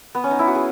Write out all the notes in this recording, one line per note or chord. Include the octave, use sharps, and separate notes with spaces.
B3
C#4
D#4
E4
F#4
G#4